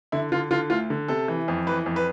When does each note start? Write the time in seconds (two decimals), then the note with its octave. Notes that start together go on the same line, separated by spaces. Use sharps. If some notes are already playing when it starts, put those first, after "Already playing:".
0.12 D3 E4
0.32 D3 F4
0.51 D3 F4
0.70 D2 F4
0.90 D3
1.08 C3 A4
1.28 E3
1.48 F2
1.67 E3 B4
1.86 F2
1.96 B4